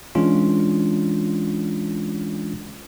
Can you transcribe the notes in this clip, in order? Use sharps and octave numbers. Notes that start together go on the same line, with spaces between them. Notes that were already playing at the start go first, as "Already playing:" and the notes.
E3 G#3 C#4 D4 F4